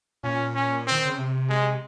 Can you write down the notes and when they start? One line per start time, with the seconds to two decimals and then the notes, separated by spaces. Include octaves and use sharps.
0.24 A#2 C#4
0.55 C#4
0.87 D#3 C4
1.05 C#3
1.18 C3
1.49 G#3